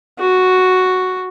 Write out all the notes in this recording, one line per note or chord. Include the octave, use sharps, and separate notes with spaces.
F#4